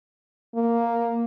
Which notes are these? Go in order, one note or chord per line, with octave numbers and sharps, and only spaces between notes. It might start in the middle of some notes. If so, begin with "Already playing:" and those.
A#3